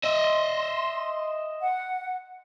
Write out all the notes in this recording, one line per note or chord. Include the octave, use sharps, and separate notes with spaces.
D#5 E5 C6
F#5